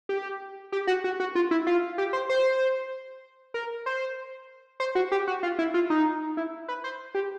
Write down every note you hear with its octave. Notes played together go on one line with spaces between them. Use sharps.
G4
G4
F#4
F#4
F#4
F4
E4
F4
G4
C5
C5
A#4
C5
C5
F#4
G4
F#4
F4
E4
F4
D#4
E4
B4
C5
G4